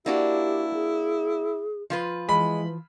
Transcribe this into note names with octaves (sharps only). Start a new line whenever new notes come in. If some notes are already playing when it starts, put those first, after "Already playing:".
A#3 D4 E4 F#4 G4
G#4
F3 F4 B4
E3 G#3 B5